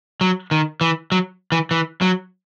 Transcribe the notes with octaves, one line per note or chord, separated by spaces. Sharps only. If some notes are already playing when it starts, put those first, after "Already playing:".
F#3
D#3
E3
F#3
E3
E3
F#3